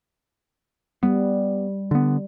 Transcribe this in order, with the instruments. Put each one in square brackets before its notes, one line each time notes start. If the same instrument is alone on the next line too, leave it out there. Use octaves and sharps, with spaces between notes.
[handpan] G3 [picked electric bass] B3
[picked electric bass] D3 B3